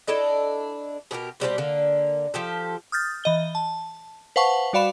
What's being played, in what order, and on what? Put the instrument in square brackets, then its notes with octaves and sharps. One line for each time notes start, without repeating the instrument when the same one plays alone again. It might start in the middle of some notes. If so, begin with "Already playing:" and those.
[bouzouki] D4 E4 A4 D#5
B2 G4 A4 A#4
B2 G3 C4 G4
D3 A#3
F3 G4 A4
[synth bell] D#6 F6 G6 A6
E3 D#5 G7
A5
B4 C5 F5 F#5 A5 C#6
G3 F#4 D5 F5 B5 E7